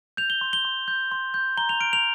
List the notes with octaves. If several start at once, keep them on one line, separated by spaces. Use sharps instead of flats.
G6 F7
G7
C6
G7
C6
G6
C6
G6
A#5 G7
F7
F6 D7
F7